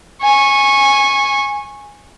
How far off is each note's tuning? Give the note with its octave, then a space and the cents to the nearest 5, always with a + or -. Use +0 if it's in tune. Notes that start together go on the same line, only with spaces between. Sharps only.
G#5 -5 C#6 -15